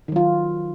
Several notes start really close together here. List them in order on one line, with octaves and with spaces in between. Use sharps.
D#3 F#3 F4